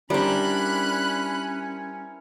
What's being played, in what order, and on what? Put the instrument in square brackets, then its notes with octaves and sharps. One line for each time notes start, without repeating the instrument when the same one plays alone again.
[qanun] G3 D4 [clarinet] C#4 [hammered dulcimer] E4 A#4 C5 [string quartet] B5 F#6